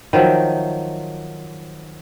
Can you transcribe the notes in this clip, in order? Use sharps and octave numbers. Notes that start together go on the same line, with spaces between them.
D#3 F3 F#3 E5